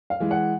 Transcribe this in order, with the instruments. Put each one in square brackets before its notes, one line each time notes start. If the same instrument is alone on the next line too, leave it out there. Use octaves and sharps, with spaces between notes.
[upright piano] F5
E3 G#3
F#5